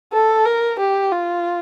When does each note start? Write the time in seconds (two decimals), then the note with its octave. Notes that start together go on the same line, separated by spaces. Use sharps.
0.13 A4
0.45 A#4
0.79 G4
1.12 F4